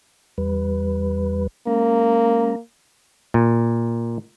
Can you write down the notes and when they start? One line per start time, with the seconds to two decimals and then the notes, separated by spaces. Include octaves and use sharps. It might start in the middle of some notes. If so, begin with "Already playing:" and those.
0.38 E2 G3 B4
1.67 G#3 A#3 C#4 A#5
3.34 A#2